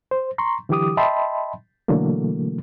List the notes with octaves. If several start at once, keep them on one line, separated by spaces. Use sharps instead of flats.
C5
A#5 C6 C#6
D3 E3 F#3 G4 D6 D#6
D#5 E5 G5 A5 B5 C6
B2 D3 E3 F#3 A3 A#3